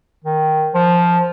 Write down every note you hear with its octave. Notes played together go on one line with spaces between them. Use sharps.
D#3
F3